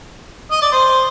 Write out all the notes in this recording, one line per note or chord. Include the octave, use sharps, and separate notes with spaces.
D#5
D5
C5